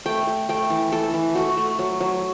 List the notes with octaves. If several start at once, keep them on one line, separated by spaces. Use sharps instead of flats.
A3 G5
A3
A3 G5
E3
E3 A4
E3
A3 F#4
A3
F#3
F#3